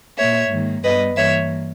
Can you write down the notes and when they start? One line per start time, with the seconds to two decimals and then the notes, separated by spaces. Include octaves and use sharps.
0.17 A#2 A#3 C#5 E5
0.50 G#2 D#3 A#3
0.83 G2 G3 B3 B4 D#5
1.16 G2 E3 A#3 C#5 E5